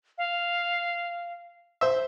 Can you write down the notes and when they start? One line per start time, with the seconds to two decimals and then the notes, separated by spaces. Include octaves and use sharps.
0.18 F5
1.81 C5 E5